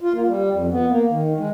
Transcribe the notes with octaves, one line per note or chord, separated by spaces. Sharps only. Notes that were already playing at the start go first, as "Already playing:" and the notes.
F4
A#3
G3
F2
B3
A#3
D#3
G#3